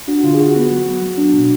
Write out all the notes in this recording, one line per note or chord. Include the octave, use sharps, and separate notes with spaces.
D4 F#4
D3 F4
G#4
D3 F#4
B3 F#4
F#3
B3
F#3
D4
B2